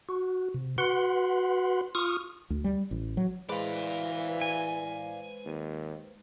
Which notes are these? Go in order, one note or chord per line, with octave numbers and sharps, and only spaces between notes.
F#4
C3
F#4 B4 F#5 C6
F4 C#6 D#6 F6
D2
G3
A1
F#3
E3 G#3 B4 C5 D5 F5
G#5
D#2